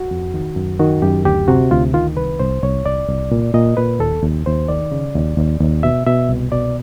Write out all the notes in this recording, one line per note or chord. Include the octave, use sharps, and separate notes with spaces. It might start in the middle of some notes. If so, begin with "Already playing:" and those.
Already playing: F#4
F2
D#3
F#2
D#3 F#4
F#2 G4
D2 G4
C3 F#4
D2 F4
D#3 F4
C2 B4
C2 C5
C2 C#5
C2 D5
C2
A#2
A#2 D#5
A#2 B4
D#2 A4
D#2
D#2 C5
D#3 D5
C#3
D#2
D#2
D#2
B2 E5
B2 E5
C2
B2 D5